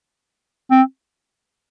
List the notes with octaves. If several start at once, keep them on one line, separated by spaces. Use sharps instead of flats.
C4